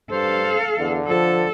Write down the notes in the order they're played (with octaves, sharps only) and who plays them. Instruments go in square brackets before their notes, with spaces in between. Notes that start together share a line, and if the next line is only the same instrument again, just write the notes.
[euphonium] G2 [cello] A4 F5 [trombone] C5
[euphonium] E2 [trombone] D3
[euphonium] F3 [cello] A4